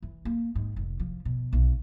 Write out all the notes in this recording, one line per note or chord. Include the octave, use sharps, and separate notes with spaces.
E3
A#3
G#2
F1
F3
B2
B1